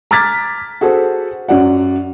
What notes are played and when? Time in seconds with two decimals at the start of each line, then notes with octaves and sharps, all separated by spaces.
0.11 A#5 D6 F6 G#6 A6 B6
0.81 F#4 G#4 A4 C5
1.49 F#2 F#3 D5 F#5